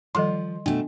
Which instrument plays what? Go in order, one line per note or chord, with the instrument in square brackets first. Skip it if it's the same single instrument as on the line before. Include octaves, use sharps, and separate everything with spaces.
[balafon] D#3 G3 A4 [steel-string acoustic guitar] F3 [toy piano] D#5 C6
[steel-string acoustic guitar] B2 A3 [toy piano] D4 [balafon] G5